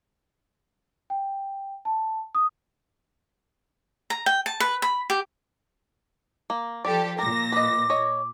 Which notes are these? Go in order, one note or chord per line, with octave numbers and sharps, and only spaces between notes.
G5
A5
D#6
A#5
G5
A5
B4
B5
G4
A#3
F3 G4 A4 D5
A#2 A#4 D6 A#6
B4 D#5 D6
C#5 D#5